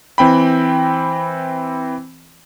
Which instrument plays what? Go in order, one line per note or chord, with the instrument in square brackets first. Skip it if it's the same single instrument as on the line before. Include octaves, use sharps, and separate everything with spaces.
[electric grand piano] E3 C4 G5 B5